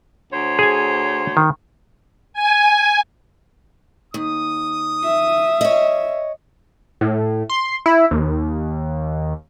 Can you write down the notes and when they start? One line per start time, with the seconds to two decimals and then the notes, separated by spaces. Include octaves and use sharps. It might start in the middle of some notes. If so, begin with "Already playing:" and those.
0.32 D2 C5 C#5
0.59 G#4 G#5
1.37 D#3
2.33 G#5
4.14 D#2 D#6
5.04 E5
5.61 C#5 D#5
7.01 A2
7.49 C6
7.86 E4
8.11 D#2